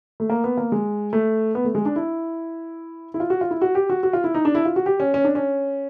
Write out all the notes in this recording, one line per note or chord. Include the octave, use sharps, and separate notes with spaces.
A3
A#3
B3
A#3
G#3
A3
B3
A3
G#3
D4
E4
E4
F4
F#4
F4
E4
F#4
G4
F#4
F#4
F4
E4
D#4
D4
E4
F4
F#4
G4
C#4
C#4
D4
C#4